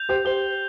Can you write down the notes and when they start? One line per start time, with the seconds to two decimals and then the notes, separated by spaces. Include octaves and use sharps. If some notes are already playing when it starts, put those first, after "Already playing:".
Already playing: G6 F7
0.09 G4 C5
0.25 G4 C5 G7